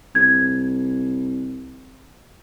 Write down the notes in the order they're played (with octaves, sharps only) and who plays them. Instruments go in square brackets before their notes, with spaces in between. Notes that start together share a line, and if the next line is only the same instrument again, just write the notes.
[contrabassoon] C2 [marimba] G#6